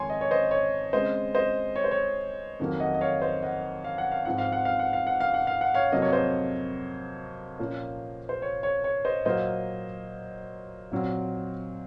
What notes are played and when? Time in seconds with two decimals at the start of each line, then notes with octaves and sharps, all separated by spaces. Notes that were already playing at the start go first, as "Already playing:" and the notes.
Already playing: F2 D#3 G#3 C#4 C#5 G#5 C6
0.10 D#5
0.21 C#5
0.31 C5 D#5
0.51 C#5
0.93 C#3 G#3 C4 C5 D#5
1.35 C5 D#5
1.76 C#5
1.84 C5
1.91 C#5
2.59 F2 D#3 F#3 A#3
2.80 D#5 F#5
2.94 D#5
3.01 C#5 F5
3.22 C5 D#5
3.43 D#5 F#5
3.84 F5
3.98 F#5
4.12 F5
4.25 G#2 F3 C4 F#5
4.38 F5
4.52 F#5
4.65 F5
4.79 F#5
4.93 F5
5.07 F#5
5.20 F5
5.34 F#5
5.47 F5
5.61 F#5
5.74 C#5 F5
5.92 F2 C3 F#3 A#3 D#5
6.02 C#5
6.13 C5 D#5
7.59 A#2 F3 A#3 C#4
8.29 C5
8.42 C#5
8.63 C#5
8.84 C#5
9.05 C5 D#5
9.25 A#2 F#3 A#3 C5 D#5
10.91 A#2 F#3 C4